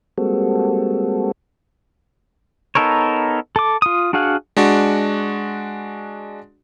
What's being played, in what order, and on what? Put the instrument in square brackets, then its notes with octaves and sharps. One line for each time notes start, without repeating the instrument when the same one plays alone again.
[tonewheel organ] G3 G#3 A#3 C4 F#4 A4
[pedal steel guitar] B3 D#4 A4 A#4 C#5
A4 D6
F4 D#6
D4 F#4 G#4 F5 F#5
[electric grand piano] G#3 D4 F#4